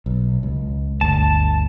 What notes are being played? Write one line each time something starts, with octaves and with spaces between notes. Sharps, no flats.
B1
C#2
G1 D2 A5